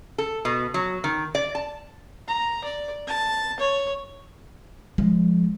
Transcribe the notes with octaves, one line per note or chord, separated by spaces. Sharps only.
A4
B2
F#3
D#3
D5
A5
A#5
D5
A5
C#5
F3 G#3